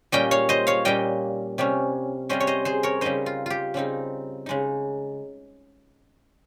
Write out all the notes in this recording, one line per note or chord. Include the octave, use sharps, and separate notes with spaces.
A#2 G3 C#4 D#5 G5
C#5 F5
C5 D#5
C#5 F5
A#2 G3 C#4 D#5 G5
C3 G3 C#4
C3 G3 C#4 C5 D#5
C#5
C5 D#5
G#4 C5
A#4 C#5
C#3 G3 C4 D#4 C5 D#5
F4
F4 G4
C#3 G3 C4 D#4
C#3 G#3 D#4